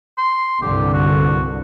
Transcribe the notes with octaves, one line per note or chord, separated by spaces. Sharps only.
C6
C2 G2 D3 G4
F#4